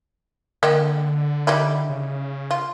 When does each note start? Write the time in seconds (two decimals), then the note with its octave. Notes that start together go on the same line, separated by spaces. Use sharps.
0.63 D3 A#3 D#5 G5
1.47 G3 D#4 E4
1.90 C#3
2.51 F4